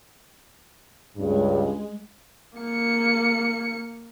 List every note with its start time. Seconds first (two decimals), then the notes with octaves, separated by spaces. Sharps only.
1.17 C#2 G2 C#3 G#3
2.58 A#3 C#7